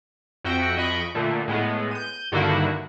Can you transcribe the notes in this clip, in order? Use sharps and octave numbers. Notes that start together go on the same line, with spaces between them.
F2 F#4 E5 G5 A#6 C#7
F2 D#5 B5 C#6 D7
A#2 D3 A3
A2 G#3 B3
G6 D#7
G2 D3 D#3 A#3 E4 F#4